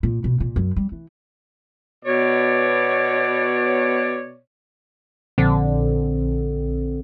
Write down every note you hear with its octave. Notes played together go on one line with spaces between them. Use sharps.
A#2
B2
A#2
F#2
G3
E3
B2 C#5 D5
A#1 D3 C4